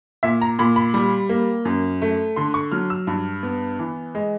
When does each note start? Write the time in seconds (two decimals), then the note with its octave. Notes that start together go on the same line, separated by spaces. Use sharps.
0.23 A#2 E5
0.41 A#5
0.59 A#2 B5
0.76 B5
0.94 G3
1.29 A#3
1.65 F#2
2.02 A3
2.36 D3 C6
2.54 C#6
2.72 F#3 F6
2.90 E6
3.07 G2
3.43 B3
3.79 E3
4.15 G#3